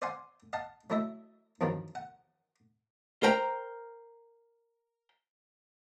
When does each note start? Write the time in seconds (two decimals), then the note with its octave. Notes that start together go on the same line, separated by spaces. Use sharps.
0.02 C5 D5 F5 F#5 G#5 C6
0.53 D#5 F5 F#5 A5
0.90 F#3 A3 E4 D#5 E5
1.61 E2 G2 D#3 F3 F#3
1.95 F#5
3.23 A#4 C5 G5 A#5